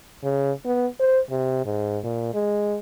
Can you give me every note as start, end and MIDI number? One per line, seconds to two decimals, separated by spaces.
0.24 0.52 49
0.65 0.87 59
1.00 1.19 72
1.30 1.62 48
1.65 1.99 44
2.04 2.30 46
2.34 2.78 56